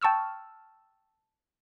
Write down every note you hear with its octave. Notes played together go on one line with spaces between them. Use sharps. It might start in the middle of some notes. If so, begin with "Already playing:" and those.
G5 A5 C#6 E6 F6